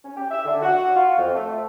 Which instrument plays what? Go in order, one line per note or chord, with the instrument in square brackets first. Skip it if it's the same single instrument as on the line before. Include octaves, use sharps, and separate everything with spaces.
[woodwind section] C#4
G4
E5
D3
F#4
F4
F2
A3